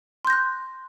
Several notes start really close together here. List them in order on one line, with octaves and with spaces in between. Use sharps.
C6 G6 A#6 F#6